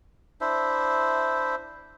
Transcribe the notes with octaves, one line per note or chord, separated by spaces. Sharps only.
D4 E4 C5 E5